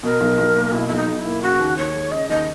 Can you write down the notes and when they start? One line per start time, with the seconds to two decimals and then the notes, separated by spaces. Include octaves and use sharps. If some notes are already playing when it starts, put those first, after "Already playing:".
0.03 B2 A#4
0.20 B1
0.38 B1
0.56 A#3
0.73 B2 E4
0.88 B1 E4
0.96 D#4
1.07 B1
1.19 E4
1.25 A#3
1.42 C#3 F#4
1.59 D#2
1.77 D#2 C#5
1.94 G#3
2.11 C#3 D#5
2.29 D#2 D#5